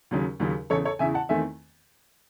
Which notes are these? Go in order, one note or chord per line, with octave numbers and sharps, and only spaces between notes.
D#2 C#3 F#3 C#4
D#2 C#3 F#3 C#4
E2 C#3 E3 A4 C#5
A4 C#5
E2 C#3 E3 E5 G#5
F#5 A5
E2 D#3 A3 C4 E5 G#5